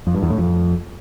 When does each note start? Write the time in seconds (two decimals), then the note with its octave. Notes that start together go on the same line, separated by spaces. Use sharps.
0.07 F2
0.15 G2
0.22 E2
0.30 A2
0.38 F2